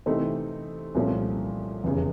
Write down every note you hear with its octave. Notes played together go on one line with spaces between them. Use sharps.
C3 E3 A3 C4 D#4
C2 A#2 F3 A3 C#4
F1 E2 C#3